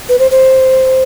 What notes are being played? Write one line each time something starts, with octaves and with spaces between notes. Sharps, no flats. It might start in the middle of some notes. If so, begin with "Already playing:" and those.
B4
C5
C5